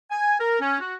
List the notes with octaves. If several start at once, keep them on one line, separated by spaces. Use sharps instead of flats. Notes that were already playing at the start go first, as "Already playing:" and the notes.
G#5
A#4
C#4
F#4